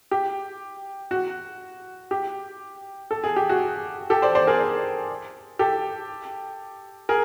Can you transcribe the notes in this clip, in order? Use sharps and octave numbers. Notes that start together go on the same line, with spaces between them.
G4
F#4
G4
A4
G#4
G4
F#4 G#4
G4 A4
C5 D5
C5 D5
G#4 A#4
G4 A4
G#4 A#4